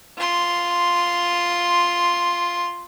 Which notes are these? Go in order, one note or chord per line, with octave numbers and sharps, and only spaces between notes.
F4 C6